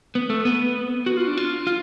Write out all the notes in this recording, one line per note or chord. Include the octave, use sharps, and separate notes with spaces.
B3
A3
B3
F#4
F4
D4
F4
F4